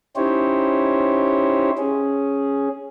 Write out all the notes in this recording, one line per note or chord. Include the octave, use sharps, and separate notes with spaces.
C#4 D#4 E4 G4 C5 C#5
C#4 G#4